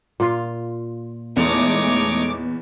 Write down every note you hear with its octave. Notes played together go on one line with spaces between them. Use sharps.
A#2 F4 F5
E2 G#3 A3 D#4 C#5 D6